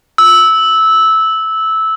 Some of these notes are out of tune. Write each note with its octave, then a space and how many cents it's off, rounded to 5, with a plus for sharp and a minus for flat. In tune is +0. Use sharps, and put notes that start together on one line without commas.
E6 -15